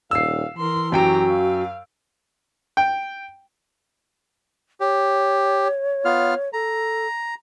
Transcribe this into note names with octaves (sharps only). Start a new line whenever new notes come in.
D#1 F5 E6 C7
E3 A#4 C6
F#2 F#4 G4 G5 A#5 D7
F5
G5
G4 C#5
B3 F4 F6
A4 A#5